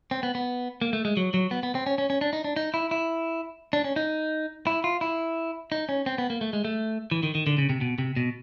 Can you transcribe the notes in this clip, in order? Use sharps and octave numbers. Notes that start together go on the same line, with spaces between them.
C4
B3
B3
A#3
A3
G#3
F#3
F#3
B3
B3
C4
C#4
C#4
C#4
D4
D#4
D4
D#4
E4
E4
D4
C#4
D#4
E4
F4
E4
D#4
C#4
C4
B3
A#3
A3
G#3
A3
E3
D#3
D#3
D3
C#3
C3
B2
C3
B2